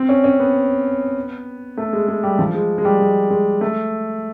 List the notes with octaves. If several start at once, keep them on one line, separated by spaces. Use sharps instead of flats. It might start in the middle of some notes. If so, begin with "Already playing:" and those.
Already playing: C4
C#4
C#4
B3
A3
G#3
G#3
G3
F3
G#3
G#3
G3
G#3
G#3
A3